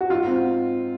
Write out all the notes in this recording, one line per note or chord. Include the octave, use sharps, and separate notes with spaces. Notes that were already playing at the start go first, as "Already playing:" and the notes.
F#4
G#2 F4
C4